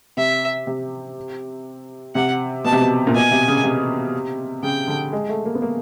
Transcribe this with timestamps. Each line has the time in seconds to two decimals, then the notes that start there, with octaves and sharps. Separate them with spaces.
0.17 C3 E5
0.67 C3
2.15 C3 F#5
2.65 B2 A5
2.72 C3
2.80 B2
3.07 A#2
3.14 B2 G#5
3.31 C3
3.48 C#3
3.64 C3
4.63 C#3 G5
4.88 D3
5.13 G#3
5.29 A3
5.45 A#3
5.55 B3
5.62 A#3